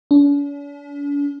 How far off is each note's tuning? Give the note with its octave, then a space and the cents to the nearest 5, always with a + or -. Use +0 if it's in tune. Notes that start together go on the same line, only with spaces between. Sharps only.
D4 -45